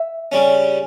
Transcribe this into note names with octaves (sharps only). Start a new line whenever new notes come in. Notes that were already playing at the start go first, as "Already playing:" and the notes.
Already playing: E5
C#3 G3 C#4